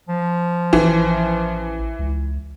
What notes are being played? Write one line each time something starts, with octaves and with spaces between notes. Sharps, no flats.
F3
A1 E3
C#2